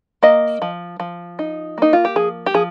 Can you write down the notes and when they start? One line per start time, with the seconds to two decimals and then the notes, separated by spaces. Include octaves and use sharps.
0.23 A#3 D#5
0.62 F3
1.00 F3
1.39 D#4
1.78 A#3 D#4
1.93 F4
2.05 G4
2.16 F3 G#4
2.46 G4
2.54 F3 G#4